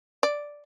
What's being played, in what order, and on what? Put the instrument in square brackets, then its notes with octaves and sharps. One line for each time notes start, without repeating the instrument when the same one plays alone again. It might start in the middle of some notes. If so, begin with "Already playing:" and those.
[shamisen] D5